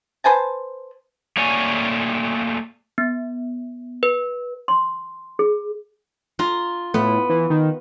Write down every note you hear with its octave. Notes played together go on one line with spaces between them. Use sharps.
B4 C5 G#5 A5
A3 A#3 C#5 D5 G#5
B3
B4
C6
G#4
F4 A#5
A2 B3
E3
D#3